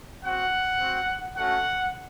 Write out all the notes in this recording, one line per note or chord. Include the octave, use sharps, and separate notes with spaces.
C4 F#4 F#5
C4 F#4
A3 C#4 F#4 F#5